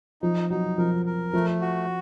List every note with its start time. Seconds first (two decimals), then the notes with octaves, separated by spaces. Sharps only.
0.22 F3 D#4
0.50 F#3 D#4
0.78 F3 A#4
1.06 A#4
1.33 F3 A3
1.61 F#4